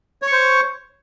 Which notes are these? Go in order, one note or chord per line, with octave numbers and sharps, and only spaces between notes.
C5 C#5 C#6